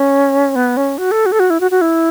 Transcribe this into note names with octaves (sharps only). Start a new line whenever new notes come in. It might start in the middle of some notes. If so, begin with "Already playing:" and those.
Already playing: C#4
B3
C#4
F#4
A4
F#4
A4
F#4
E4
F#4
F#4
E4